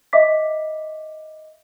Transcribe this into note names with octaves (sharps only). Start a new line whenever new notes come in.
D#5 E5 D6 B6